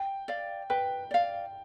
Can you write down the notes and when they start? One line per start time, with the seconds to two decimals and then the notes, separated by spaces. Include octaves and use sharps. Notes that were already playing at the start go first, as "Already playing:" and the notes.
Already playing: G5
0.28 D5 F5
0.70 B4 G5
1.11 D5 F5